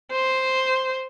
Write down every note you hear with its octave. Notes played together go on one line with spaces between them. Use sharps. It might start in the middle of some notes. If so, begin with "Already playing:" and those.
C5